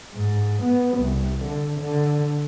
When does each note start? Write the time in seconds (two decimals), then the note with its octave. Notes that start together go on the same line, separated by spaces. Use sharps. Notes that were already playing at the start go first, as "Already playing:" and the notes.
0.15 G#2
0.63 B3
0.98 C2
1.43 D3
1.80 D3